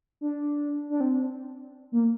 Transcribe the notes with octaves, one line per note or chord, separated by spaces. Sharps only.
D4
D4
C4
A#3